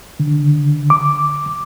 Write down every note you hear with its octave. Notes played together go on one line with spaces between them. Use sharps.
D3
D6